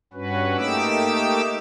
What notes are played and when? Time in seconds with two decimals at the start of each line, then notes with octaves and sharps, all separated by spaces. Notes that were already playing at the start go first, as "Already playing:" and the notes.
0.13 G2 C#4 F#4 B4
0.57 A3 A#3 D#4 G4 D6 E6